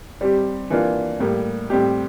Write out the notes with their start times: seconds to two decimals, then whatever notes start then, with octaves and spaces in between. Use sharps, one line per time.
0.21 G3 C4 G4
0.70 E3 A#3 D4 F4
1.20 A2 G3 A#3
1.70 A2 G3 C4 G4